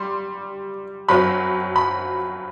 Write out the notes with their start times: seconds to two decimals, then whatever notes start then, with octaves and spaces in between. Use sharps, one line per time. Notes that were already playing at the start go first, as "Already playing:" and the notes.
Already playing: G3 C6
1.08 F#2 F#3 C4 B5
1.76 B5